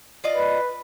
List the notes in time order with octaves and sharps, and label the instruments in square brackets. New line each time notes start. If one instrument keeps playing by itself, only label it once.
[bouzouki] F4 D5 D#5
[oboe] B4